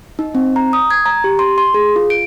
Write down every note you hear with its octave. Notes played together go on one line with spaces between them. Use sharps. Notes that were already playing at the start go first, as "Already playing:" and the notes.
D#4
C4
A#5
D#6
G#6
A#5
G4
C6
C6
G#4
F4
D7